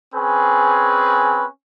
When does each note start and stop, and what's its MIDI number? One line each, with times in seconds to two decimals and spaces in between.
0.14 1.45 60
0.14 1.45 61
0.14 1.45 68
0.14 1.45 71